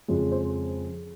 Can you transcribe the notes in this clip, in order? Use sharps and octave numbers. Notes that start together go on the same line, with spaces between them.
F2 C#3 G#3
C5